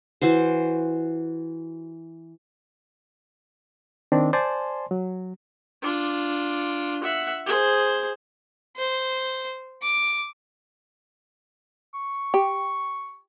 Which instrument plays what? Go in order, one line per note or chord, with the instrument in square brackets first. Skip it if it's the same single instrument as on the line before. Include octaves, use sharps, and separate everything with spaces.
[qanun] E3 F#4 C5
[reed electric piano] D#3 C4 D4
C5 D5 G#5 A5 C6
F#3
[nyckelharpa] D4 F4
E5 F#5
G#4 C5
[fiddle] C5
D6
[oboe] C#6
[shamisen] G4